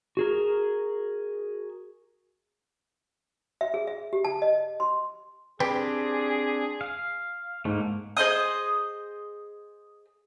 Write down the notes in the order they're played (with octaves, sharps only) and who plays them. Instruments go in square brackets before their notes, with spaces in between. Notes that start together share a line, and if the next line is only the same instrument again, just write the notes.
[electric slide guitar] F#4 G#4 A#4
[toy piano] E5
G#4
E5
G4
A5
D#5
C6
[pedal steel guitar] C4 D4 G4 [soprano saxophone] G#4 [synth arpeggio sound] B4 G5
[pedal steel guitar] F5
[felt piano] G#2 [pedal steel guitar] A3 A#3
[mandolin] G#4 C5 D#5 D#6